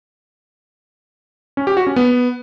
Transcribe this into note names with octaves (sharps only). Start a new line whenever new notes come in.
C#4
G4
F#4
C#4
B3